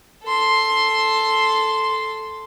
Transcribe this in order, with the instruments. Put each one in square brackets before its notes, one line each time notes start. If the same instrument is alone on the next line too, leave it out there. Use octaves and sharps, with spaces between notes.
[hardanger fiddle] A4 C6